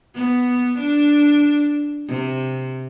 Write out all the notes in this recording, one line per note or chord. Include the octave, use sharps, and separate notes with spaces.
B3
D4
C3